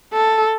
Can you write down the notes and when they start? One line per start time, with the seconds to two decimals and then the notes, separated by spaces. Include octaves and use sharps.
0.13 A4